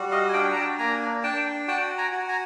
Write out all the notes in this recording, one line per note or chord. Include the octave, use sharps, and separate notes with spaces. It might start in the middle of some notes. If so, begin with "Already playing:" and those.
Already playing: G3 F#4
D#5 F5
G#5
D4 F5 G5
A#5
G5 A5
A#3 G#5 A#5
D4 G5 A5
F#4 G5 A5
G#5 A#5
F#4
G#5 A#5